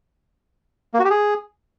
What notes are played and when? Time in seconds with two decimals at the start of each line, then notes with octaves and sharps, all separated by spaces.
0.94 A#3
0.99 F#4
1.05 G4
1.10 G#4